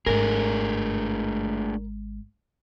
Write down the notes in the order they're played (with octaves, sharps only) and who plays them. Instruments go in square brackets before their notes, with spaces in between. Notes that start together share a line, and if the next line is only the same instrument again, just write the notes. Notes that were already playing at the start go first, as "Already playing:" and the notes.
[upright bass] G#1 G#3 [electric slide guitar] A3 D4 G#4 [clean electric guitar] A#4